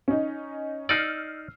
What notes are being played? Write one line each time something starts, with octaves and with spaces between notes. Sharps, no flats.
C#4 D#4
D#4 D5 E6 F6 C7